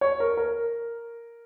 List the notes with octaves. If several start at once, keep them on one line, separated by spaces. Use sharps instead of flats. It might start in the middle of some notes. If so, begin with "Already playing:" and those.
C#5
A#4
A#4